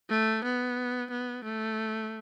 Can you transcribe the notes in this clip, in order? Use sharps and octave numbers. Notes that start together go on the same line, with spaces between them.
A3
B3
B3
A3